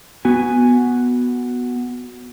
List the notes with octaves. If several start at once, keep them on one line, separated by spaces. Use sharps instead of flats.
B3 F#4 G#5